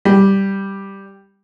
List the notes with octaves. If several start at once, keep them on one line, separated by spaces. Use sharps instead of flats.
G3